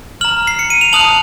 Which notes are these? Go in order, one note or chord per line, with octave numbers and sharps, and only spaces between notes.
A#5 F6 F#7
C7
C#7
D#7
F7
A5 D#6 F#6 F#7